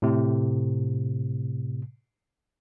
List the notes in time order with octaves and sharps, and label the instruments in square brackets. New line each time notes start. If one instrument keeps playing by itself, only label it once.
[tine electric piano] A2 C3